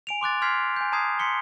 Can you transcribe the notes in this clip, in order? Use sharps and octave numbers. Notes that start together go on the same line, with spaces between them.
G#5 D7 F7
C6 D6 F#6 A6
C6 F6 G#6 B6 C7
G#5 G6
A5 A#5 D#6 G#6 C7
C6 B6 C#7 G7